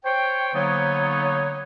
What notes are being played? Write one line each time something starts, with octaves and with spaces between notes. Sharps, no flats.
C5 C#5 G5
D3 F#3 A#3 B3 D#4 C#5